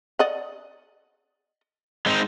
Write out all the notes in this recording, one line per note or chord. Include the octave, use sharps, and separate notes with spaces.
D5 D#5 F#5
G#3 C4 D#4